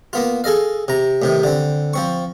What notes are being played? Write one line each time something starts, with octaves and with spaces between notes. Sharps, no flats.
A#3 B3 F4
G#4 A4 D#5 F5
C3 A#5
A2 C3 D#3
D3 C4
F3 C4 C#6